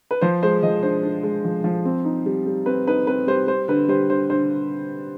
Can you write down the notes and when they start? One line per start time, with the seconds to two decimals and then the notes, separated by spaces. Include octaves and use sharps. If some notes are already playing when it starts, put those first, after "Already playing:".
0.11 B4
0.21 F3 C5
0.43 G#3 C5
0.63 F3 D#5
0.83 D4 C5
1.03 D4
1.23 G#3
1.45 F3
1.64 F3
1.85 C4
2.05 D#4
2.26 G3
2.46 G3
2.66 C4 B4
2.88 D#4 B4
3.07 C4 B4
3.27 G3 C5
3.48 G3 C5
3.68 D3 B4
3.89 G3 C5
4.10 D3 C5
4.30 D3 C5